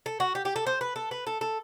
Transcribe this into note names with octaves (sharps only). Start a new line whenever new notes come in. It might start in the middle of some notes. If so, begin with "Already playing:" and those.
A4
F#4
G4
G4
A4
C5
B4
A4
B4
A4
A4